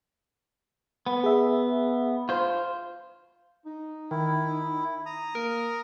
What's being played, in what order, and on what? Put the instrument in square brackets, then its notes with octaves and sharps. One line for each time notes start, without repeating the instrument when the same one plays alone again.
[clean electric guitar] B3
[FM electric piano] G#4 E5
[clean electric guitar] F4 C5
[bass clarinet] D#4
[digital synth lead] D#3 [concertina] E4
[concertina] A#5 D#6
[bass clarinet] A#3 [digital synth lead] A#4